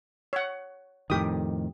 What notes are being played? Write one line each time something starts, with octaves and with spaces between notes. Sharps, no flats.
C#5 F#5
F2 A2 D#3 G4 D#6